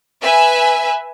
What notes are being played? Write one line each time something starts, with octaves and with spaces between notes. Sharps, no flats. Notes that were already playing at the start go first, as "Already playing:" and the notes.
B4 E5 G#5